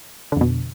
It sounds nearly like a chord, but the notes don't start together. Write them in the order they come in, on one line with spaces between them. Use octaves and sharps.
D3 F2 B2